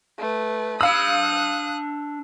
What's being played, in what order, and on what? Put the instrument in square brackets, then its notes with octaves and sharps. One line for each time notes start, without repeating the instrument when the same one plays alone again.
[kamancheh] A3 B4
[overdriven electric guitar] D4 B5 [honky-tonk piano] F5 E6 [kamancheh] D#6 F#6